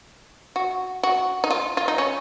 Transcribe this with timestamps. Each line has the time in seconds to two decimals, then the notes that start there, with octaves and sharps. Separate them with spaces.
0.56 F#4
1.03 F#4
1.44 D#4
1.51 F4
1.77 F4
1.88 D#4
1.98 C#4